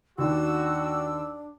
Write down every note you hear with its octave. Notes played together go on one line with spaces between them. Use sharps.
D#2 D4 F#4 E6